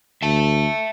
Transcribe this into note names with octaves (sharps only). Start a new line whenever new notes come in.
D2 E5 A5